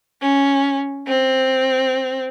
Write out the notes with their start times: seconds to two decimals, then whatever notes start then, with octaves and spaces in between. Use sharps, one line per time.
0.22 C#4
1.07 C4